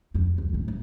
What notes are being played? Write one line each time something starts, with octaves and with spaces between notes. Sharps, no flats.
F2 C#4
C#2
G#1 A2
C#2 A#3